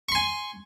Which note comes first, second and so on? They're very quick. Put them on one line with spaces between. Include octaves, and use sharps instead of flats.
C#6 C6 G#5